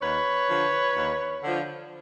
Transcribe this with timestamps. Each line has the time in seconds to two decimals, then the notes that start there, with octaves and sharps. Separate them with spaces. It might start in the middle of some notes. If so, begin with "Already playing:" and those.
0.01 D#2 B4 C#5
0.49 D3 F3
0.95 D#2
1.43 D3 F3